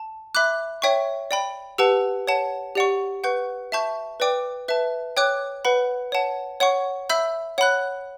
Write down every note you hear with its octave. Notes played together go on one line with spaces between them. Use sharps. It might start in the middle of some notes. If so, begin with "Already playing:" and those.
Already playing: A5
E5 B5 D6 F#6
C#5 E5 G5 C#6
D5 G5 B5
G4 B4 F#5 A5 E6
C#5 F#5 A5
G4 D5 F#5 C#6
B4 F#5 C#6 G6
E5 A5 C#6 G6
B4 D5 G5 D6
B4 E5 A5
C#5 G5 D6 F#6
B4 F#5 B5
C#5 F#5 A5
C#5 F#5 C#6
E5 B5 E6 G6
C#5 F#5 B5 F#6